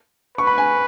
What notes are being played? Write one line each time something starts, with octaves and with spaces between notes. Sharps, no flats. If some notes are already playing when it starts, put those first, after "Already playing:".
B4 C#6
B5
G#5